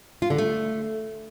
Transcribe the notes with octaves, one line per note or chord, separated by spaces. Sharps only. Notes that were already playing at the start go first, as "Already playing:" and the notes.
F4
D3
A3